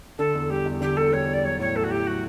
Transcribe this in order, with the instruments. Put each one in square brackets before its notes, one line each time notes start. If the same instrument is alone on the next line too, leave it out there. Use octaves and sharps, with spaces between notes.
[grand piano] D3 [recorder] A4
[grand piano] E2
[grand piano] G3 [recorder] G4
[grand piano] E2
[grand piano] D3 [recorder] G4
[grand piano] E2 [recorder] A4
[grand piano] G3 [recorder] C#5
[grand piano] E2 [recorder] D5
[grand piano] F#3 [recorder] C#5
[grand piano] A2 [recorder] C#5
[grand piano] A3 [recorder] A4
[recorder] F#4
[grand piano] A2 [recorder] G4
[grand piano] F#3 [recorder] F#4